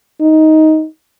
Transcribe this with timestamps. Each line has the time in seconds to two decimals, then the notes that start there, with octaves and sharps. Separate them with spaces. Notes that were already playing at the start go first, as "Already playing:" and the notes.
0.21 D#4